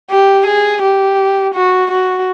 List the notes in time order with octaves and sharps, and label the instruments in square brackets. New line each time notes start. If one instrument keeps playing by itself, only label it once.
[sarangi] G4
G#4
G4
F#4
F#4